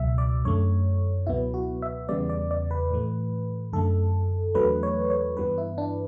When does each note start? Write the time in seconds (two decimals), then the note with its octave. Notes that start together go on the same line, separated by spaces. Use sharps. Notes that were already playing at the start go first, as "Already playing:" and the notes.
Already playing: C#2 B2 F#3 E5
0.18 D5
0.45 F#2 D3 A3 C#5
1.27 C#2 B2 F#3 B3 E4
1.54 F#4
1.82 E5
2.09 E2 C#3 G3 B3 D5
2.29 D5
2.51 D5
2.71 B4
2.91 A2 E3 A3
3.73 F#2 D3 A3 A4
4.54 E2 D3 F#3 A3 B4
4.83 C#5
5.10 C#5
5.37 G2 E3 G3 B3 B4
5.58 E4
5.78 D4